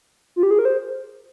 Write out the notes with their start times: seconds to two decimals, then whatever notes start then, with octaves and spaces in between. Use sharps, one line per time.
0.36 F4
0.43 G4
0.51 G#4
0.59 A#4
0.65 C5